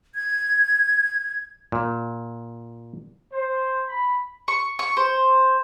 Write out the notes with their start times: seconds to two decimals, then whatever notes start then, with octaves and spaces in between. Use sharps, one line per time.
0.15 G#6
1.72 A#2
3.32 C5
3.88 B5
4.48 C#6
4.79 C#6
4.97 C5